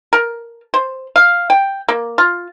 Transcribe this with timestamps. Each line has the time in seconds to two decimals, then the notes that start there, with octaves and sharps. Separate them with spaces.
0.13 A#4
0.74 C5
1.16 F5
1.50 G5
1.89 A#3
2.18 F4